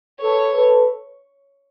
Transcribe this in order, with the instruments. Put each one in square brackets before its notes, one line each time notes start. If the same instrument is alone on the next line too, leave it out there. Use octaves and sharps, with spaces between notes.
[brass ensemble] A4 B4 [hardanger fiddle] C#5
[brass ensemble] A4 B4